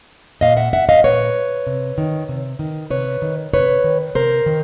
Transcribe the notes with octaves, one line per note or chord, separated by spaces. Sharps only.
A#2 D#5 F5
E5 F#5
E5 F#5
D#5 F5
A#2 B4 C#5
C3
D#3
C3
D#3
C3 B4 C#5
D#3
C3 B4 C#5
D#3
C3 A#4 C5
D#3